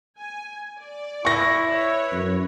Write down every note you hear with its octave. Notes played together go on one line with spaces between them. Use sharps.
G#5
D5
E4 C#6 A#6
B4 C#5
F#2